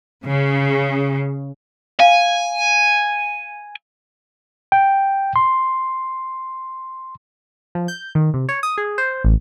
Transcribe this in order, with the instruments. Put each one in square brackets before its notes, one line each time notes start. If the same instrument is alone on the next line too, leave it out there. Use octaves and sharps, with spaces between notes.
[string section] C#3
[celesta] F5 [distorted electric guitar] G#5
[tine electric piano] G5
C6
[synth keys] F3
G6
D#3
C3
C#5
D#6
G#4
C5
A1